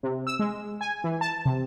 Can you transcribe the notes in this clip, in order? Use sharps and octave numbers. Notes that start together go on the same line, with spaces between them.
C3
E6
G#3
G#5
E3
A5
C3